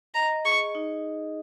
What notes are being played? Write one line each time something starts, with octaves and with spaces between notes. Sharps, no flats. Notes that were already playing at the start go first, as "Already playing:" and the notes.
D#5 A#5
G#4 C#6
D#4